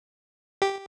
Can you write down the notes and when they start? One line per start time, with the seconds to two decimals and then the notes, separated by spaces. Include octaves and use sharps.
0.62 G4